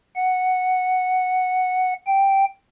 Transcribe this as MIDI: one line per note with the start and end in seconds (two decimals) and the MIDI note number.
0.16 1.93 78
2.07 2.45 79